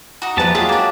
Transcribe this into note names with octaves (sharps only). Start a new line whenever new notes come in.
D#4 F#4
E2 F3 G#3 A#3 G4 B4 A5
F#3 F4 G#4 A4 E5
A#3 D4